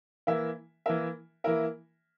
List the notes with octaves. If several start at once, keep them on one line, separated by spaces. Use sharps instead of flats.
E3 A#3 E4 A#4 E5
E3 A#3 E4 A#4 E5
E3 A#3 E4 A#4 E5